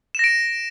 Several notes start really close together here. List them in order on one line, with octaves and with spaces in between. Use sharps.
E7 A#6 D7